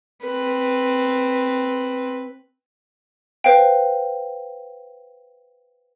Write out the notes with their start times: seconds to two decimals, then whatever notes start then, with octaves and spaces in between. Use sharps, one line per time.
0.23 C4 B4
3.44 B4 C5 F5 G5